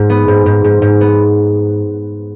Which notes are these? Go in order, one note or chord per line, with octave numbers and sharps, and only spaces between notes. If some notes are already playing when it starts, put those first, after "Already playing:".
Already playing: G#2
B3
G#2
G#2
G#2
G#2
B3